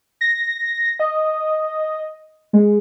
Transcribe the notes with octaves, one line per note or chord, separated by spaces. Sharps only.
A#6
D#5
G#3